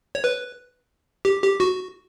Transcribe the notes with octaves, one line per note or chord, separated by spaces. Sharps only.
C#5
B4
G4
G4
F#4